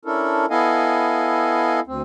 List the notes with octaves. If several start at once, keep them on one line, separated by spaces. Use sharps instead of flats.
C#4 D4 E4 A4 A#4
B3 E4 A4 D#5 F5 G#5
D2 C4